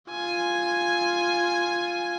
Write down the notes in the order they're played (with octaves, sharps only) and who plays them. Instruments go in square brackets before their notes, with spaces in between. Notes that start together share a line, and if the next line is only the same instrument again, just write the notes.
[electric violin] F4 G#5